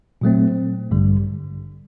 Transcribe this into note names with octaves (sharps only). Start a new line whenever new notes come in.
A#2 F#3 A3 C4
A1 G2 D3 G3